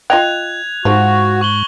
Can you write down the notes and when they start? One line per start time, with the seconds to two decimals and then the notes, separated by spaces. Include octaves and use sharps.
0.10 F4 D#5 G5 F#6 G#6 F7
0.85 G#2 F3 F#4
1.41 C#6 F#7 G7